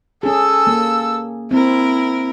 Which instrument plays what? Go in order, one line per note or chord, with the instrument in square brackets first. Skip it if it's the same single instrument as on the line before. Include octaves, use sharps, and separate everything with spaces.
[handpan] C#4 G#4 [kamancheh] A4 E6
[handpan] A#3
[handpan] C4 [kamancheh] E4 A#4